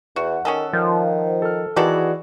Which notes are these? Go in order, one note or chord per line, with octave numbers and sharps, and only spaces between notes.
E2 F#4 F#5
D#3 C#4 G#4 A4
D#3 F3
A4 F6
D#3 E3 B3 F#4 G#4 A4 D5